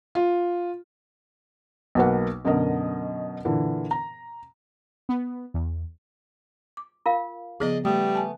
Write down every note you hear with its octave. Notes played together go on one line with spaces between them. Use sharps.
F4
B1 F#3 A#3 F#4 B4 F#5
F#2 B2 D3 A#4 D#5
A#2 D3 E3
A#5
B3
E2
D6
F4 A#4 F5
C#3 F3 B3 G#4 D5 D#5
G3 A3 B3 D#6
G#5 A5